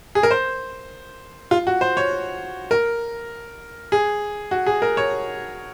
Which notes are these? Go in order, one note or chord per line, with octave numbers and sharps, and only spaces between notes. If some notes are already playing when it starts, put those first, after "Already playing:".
G#4
A#4
C5
F4
F#4
C5
C#5
A#4
G#4
F#4
G#4
A#4
C#5